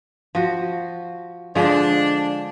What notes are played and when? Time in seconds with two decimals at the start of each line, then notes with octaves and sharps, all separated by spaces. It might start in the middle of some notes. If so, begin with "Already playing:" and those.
0.35 F3 F#4
1.55 D3 F3 G#3 D4